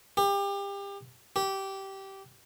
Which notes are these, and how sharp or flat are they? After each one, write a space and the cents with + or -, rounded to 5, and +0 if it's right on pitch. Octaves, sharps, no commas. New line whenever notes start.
G4 +30
G4 -15